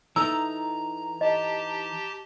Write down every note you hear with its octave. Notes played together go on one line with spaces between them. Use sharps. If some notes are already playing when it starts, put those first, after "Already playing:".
E3 D#4 A4 A#5 E6
G4 D#5 A5